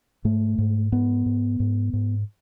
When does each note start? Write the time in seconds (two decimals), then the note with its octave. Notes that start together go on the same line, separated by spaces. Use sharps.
0.25 G#2 A3
0.58 G#2
0.92 G#2 B3
1.26 G#2
1.60 G#2
1.93 G#2